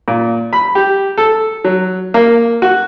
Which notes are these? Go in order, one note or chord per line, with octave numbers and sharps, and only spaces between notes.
A#2
B5
G4
A4
F#3
A#3
F#4